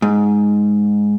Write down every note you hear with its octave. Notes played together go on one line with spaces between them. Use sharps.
G#2